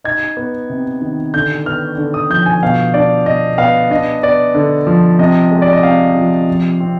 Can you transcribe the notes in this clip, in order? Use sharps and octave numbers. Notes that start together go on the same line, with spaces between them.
D#4 G#6
B3
C3
D#3
D3 G6
B3 F6
D3
D#6
F3 G6
G#5
B2 F5
D4 D5
B2 D#5
B3 F5
D4 D#5
B3 D5
D3
F3
C3 D#5
G#3
D5
D#5
C3 F5
F3
F3
C4